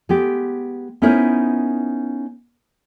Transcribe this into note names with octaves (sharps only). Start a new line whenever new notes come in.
G#3 B3 G4
B3 C#4 D#4 E4 A#4 C5